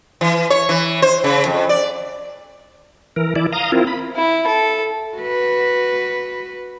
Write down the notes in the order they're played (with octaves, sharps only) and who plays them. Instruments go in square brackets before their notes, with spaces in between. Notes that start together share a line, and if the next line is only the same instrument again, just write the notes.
[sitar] E3
C#5
E3
C5
C#3
F2
D5
[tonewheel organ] E3 A#4
E3 E4 D5
F5 A#5 D#6
C4 E4 F4 A#4
B5
[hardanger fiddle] E4
A4
[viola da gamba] F#4 B4